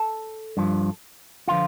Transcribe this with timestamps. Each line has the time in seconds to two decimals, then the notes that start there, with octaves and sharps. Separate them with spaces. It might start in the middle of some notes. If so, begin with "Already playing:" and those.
Already playing: A4
0.57 G2 F3
1.48 D3 F3 F4